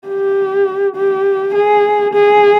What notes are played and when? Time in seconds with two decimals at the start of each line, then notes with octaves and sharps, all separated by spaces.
0.08 G4
0.96 G4
1.54 G#4
2.14 G#4